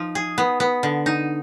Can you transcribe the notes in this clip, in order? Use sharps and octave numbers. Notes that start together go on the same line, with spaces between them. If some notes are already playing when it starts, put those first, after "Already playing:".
Already playing: F3 D#4
G#4
B3
B3
D3
D#4